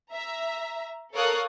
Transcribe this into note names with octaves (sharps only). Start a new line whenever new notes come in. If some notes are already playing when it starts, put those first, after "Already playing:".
E5 A#5
A4 A#4 C#5 F5 D#6 F#6